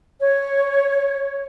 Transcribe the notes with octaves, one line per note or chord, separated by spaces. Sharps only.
C#5